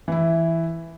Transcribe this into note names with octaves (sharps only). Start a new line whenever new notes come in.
E3 E4